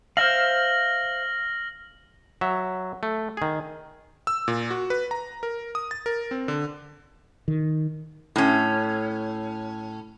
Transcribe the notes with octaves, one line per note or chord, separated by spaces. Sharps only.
C5 E5 F5 F6 A#6 F#7
F#3 E5
A3
D#3 G#4
E6
A#2
F#4
B4
A#5
A#4
D#6
A6
A#4
C4
D3
D#3
A2 C#4